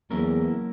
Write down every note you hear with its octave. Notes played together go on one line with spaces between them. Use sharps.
E2 F#3 A#3 C#4 E4 A#4